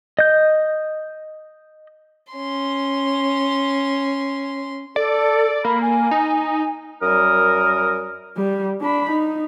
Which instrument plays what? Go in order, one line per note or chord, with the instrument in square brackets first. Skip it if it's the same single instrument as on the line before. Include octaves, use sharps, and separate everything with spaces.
[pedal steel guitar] D#5 G6
[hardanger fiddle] C#4 C6
[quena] A4 [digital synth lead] D5
[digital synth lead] A#3 [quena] B5
[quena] G#5
[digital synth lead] D#4
[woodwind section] F#2 G3 A#4 D#6
[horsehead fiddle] G3
D4 B5
D#4